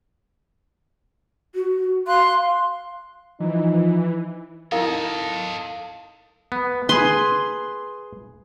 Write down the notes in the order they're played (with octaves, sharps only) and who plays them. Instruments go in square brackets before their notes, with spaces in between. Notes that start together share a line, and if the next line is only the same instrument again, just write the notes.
[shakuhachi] F#4
[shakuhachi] F5 [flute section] C6 F#6
[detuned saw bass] E3 [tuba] F3 [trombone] D#4
[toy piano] D#4 E4 A#4 [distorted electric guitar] A4 D#5 [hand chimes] F5
[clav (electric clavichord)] B3
[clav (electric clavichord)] G#4 B4 [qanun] C6